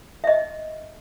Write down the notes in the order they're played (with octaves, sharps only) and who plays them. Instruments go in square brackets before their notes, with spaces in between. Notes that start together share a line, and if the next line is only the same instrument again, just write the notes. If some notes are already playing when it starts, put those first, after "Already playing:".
[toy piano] D#5 E5